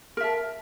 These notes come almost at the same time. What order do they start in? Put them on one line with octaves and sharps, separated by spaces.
A#4 E5 A5